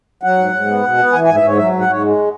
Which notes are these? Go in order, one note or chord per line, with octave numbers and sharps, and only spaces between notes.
F#3 F#5
G#2
G#2
B3
B2
B3
E3 G#5
G#2 G#5
E5
G#2 C#5
F#3 E5
G#2
F#5
G#2 C#5
G#3